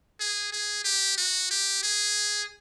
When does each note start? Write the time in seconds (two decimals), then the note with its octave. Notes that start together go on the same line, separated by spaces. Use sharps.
0.20 G#4
0.52 G#4
0.84 G4
1.18 F#4
1.51 G4
1.83 G#4